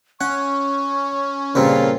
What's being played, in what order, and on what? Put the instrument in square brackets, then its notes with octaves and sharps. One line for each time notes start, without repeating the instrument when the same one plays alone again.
[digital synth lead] C#4 [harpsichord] F#5 [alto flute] C#6
[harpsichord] G2 A#2 C4 [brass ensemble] C#3 A#3 F4